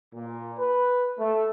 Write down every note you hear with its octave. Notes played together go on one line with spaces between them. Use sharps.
A#2
B4
A3